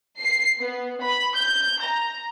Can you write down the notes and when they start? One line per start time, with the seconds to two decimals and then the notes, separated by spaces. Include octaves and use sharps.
0.21 C7
0.62 B3
1.04 B5
1.37 G6
1.83 A#5